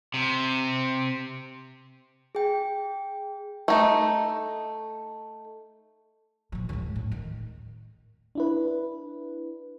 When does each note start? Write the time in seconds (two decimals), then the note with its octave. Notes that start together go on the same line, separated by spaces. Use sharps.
0.14 C3
2.35 G#4 G5
3.68 A3 D#4
6.52 A#2 F3
6.69 D#2 G#2
6.96 A2
7.12 D#3
8.35 D4 E4 B4